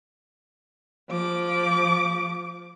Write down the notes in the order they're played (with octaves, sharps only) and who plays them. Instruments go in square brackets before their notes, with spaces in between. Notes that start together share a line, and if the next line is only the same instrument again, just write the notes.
[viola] F3 D6